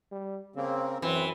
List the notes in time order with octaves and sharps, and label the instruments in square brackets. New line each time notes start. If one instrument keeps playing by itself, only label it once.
[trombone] G3
[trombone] C#3 [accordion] A#3 C4
[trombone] F#2 [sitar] E3 [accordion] C4